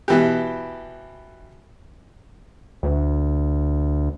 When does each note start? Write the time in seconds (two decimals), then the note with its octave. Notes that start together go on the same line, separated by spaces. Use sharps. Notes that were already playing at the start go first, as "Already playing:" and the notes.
0.08 B2 E3 G4
2.83 D2